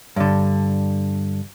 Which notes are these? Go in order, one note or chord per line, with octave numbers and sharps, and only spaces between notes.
G2 D3